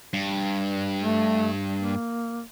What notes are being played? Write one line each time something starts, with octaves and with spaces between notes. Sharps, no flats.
G2
A3
A#3